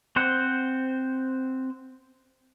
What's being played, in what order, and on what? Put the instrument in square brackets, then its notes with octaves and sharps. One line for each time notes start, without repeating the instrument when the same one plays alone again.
[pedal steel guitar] C4 C5 F#5